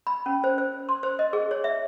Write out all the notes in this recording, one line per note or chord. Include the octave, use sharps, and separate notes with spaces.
B5
C#4
C5
C5
C6
C5
D#5
G#4
C#5
E5